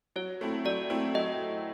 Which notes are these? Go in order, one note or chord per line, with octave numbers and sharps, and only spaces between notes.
F#3 C#5
A3 C4 E4
F#3 D5
A3 C4 E4
F#3 D#5